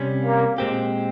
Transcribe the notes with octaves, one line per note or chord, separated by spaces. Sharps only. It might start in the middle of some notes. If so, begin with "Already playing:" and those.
Already playing: C3 G3 C#4
A#3
A#2 G#3 C4 G4